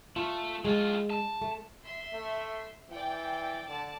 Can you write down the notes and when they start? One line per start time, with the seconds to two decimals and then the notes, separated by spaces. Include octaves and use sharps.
0.16 A3 F4
0.65 A2 G#3 F4
1.10 A5
1.41 A3
1.83 E5 C6
2.13 A3
2.90 E3 D5 G5
3.68 D3 D5 A5